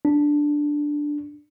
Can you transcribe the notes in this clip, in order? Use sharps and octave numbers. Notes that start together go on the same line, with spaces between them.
D4